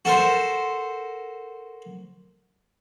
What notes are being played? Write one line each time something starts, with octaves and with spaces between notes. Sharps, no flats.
F#4 A4 A#4 C5